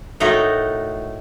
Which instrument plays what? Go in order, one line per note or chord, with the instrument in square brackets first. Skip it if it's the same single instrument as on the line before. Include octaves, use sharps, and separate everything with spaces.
[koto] A2 A3 D#4 F#4 A#4